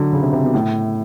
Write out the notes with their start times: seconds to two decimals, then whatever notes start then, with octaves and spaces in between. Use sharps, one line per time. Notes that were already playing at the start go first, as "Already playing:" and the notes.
Already playing: D3 F#3
0.12 C#3
0.22 C3
0.33 C3
0.44 B2
0.54 A2